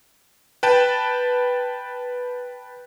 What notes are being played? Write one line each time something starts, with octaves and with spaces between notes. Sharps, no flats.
B4 G5 A5